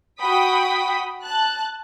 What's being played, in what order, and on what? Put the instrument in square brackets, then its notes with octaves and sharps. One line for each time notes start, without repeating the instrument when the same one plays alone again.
[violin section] F#4 G5 B5 D#6 B6
A5 F#6